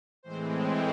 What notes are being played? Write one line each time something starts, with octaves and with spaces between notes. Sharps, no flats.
A2 E3 G#3 C4 C5